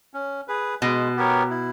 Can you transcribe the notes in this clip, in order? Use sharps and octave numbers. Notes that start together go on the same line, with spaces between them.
C#4
G#4 B4
B2 G#3
B3 G4 A#4 C#5
E4